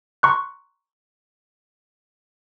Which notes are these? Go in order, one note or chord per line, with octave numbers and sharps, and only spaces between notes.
A#5 C6 C#6 F#6